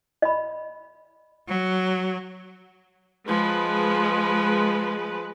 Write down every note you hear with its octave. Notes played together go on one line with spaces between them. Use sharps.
D#5 B5
F#3
F3 G#3 B4